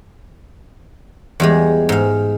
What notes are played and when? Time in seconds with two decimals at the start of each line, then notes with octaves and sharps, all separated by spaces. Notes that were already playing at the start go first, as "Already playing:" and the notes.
1.40 E2 G3 G#3
1.89 G#2 F5